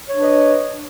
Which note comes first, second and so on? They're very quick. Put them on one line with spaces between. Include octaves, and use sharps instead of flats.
C#5 D4 B4 D#5